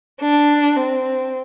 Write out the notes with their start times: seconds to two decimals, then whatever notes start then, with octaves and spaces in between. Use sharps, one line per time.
0.22 D4
0.76 C4